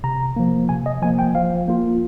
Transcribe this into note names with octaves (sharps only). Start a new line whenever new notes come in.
C3 A#5
F3 A#3
C3 G#5
D#5
F3 A#3 G#5
G5
F3 F5
A#3 F4